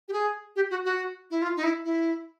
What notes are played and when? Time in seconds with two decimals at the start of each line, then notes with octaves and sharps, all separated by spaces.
0.08 G4
0.13 G#4
0.56 G4
0.70 F#4
0.85 F#4
1.31 E4
1.42 F4
1.57 D#4
1.63 E4
1.85 E4